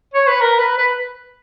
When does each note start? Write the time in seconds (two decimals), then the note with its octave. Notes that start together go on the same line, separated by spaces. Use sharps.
0.14 C#5
0.27 B4
0.41 A#4
0.59 B4
0.78 B4